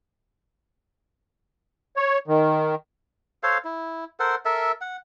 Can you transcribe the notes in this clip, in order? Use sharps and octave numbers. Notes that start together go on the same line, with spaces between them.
C#5
D#3
A4 C5 C#5 F5
E4
A4 A#4 C5 F#5
A4 A#4 E5
F#5